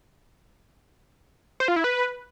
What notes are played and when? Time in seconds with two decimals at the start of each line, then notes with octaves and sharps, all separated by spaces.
1.60 C5
1.68 F4
1.76 E4
1.84 B4